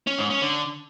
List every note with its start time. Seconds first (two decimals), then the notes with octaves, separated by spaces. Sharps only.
0.07 C#4
0.19 G#2
0.30 C#4
0.42 D3